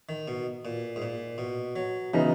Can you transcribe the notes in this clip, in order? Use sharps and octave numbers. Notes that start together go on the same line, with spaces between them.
D#3
B2
A#2
G#2
A#2
B2
F#3
C#3 E3 F#3 B3 D#4